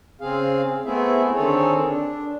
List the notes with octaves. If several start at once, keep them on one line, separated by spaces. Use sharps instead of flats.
C#3 C4 G#4 F5
A3 B3 C4 E4 G#4 E5
D3 D#3 C4 G#4 A4 C#5
D4